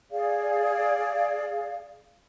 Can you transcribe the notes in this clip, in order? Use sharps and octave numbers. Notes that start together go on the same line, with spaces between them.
G#4 D5 F5